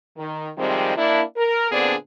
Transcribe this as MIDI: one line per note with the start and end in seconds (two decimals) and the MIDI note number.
0.17 0.50 51
0.58 0.97 48
0.58 0.97 51
0.58 0.97 53
0.58 0.97 55
0.58 0.97 56
0.58 0.97 60
0.97 1.22 58
0.97 1.22 62
0.97 1.22 64
1.37 1.70 70
1.72 1.94 46
1.72 1.94 50
1.72 1.94 59
1.72 1.94 60
1.72 1.94 62
1.72 1.94 68